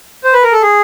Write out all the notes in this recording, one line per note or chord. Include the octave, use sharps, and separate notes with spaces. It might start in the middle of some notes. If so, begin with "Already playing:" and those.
C5
B4
A#4
A4
G#4